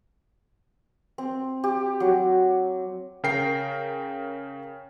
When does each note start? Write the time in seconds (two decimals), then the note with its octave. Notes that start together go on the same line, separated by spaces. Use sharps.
1.18 C4
1.64 G4
2.00 F#3
3.24 C#3 A#4 G5 C7